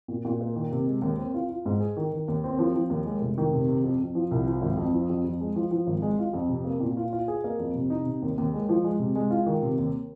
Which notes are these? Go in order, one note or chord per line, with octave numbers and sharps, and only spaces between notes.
A#2
A#2
A#3
D#3
C3
G#3
D#2
C4
F4
F4
G#2
G#4
D#3
D#3
D#2
C4
F3
F3
D#2
G#3
F1
D#3
C3
C3
F2
F2
F3
C2
F3
G#1
F2
F3
F2
F2
G#3
F3
F3
G#1
G#3
F4
F2
C3
A#3
A#2
F4
F4
G#4
A#3
F2
C3
D#4
C3
D#2
D#2
G#3
F3
G#3
C3
G#3
F4
D#3
C3
D#2